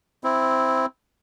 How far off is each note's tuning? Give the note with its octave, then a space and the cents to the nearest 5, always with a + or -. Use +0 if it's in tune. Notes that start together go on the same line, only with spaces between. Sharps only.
C4 +0 E4 +0